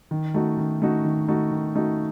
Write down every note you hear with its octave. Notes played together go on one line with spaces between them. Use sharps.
D#3
A3 D#4 F#4
D#3
A3 D#4 F#4
D#3
A3 D#4 F#4
D#3
A3 D#4 F#4